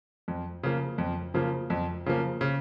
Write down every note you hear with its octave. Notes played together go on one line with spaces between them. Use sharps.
F2
C#3 F3 A#3
F2
C#3 F3 A#3
F2
C#3 F3 A#3
C#3